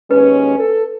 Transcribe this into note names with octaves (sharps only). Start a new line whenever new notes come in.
D#2 G#3 C#4 B4
A4